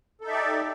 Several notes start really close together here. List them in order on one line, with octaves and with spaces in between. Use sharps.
A4 D#4 E5 D5 G4